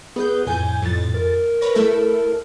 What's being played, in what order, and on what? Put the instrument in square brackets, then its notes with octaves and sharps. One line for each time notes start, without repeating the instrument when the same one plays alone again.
[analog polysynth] B3 G6 [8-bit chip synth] G#4 B4
[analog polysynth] F2 G#5 G6 [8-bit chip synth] A2
[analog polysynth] F2 A6
[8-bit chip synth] A#4
[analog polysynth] B4 C#5 A#6
A3 E4 A4